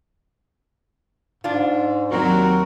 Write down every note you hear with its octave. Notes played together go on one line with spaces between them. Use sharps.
G#2 D4 F4
D#2 F#3 C4 F#4 A#4